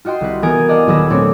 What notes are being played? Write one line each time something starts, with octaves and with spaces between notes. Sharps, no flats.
F4 F#4 D#5 G5 C6
C2 B4
E3 B3 A#4 G#5 D#6 D7
D5 D#5 F5 F#5 G#5 A5
D#1 F#3 G#4 B4 E6 A#6
A#2 A3 C4 D4 C#5